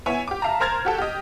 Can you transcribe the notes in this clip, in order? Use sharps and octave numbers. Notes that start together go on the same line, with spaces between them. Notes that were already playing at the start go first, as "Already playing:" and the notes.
B3 E4 C#5 E5 G#5
G4 D6
E5 F5 A5 A#5
A#4 C5 A#5 F6 G#6 A6
F#4 G4 A4
G4 D#5